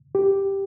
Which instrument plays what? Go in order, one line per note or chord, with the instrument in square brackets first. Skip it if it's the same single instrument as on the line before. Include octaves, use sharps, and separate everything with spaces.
[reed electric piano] G4